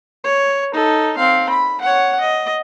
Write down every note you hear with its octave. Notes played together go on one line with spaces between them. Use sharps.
C#5
D#4 A4
C4 F5
B5
C#5 F#5
D#5